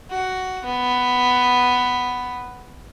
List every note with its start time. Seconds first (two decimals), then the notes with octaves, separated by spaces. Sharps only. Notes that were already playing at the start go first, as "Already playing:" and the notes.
0.10 F#4
0.65 B3